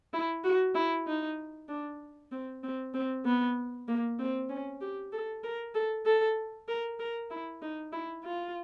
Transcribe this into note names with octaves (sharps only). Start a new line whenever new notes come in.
E4
F#4
E4
D#4
D4
C4
C4
C4
B3
A#3
C4
C#4
G4
A4
A#4
A4
A4
A#4
A#4
E4
D#4
E4
F4